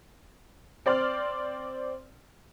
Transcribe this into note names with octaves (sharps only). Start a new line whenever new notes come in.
C4 D5 C6 F6